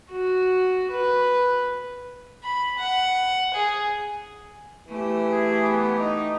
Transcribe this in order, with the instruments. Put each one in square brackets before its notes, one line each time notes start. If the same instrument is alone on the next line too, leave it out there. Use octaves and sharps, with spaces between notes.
[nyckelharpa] F#4
B4
[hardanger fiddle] B5
F#5
G#4
[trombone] E3 [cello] A3 G4
[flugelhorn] G#4
B3
D#4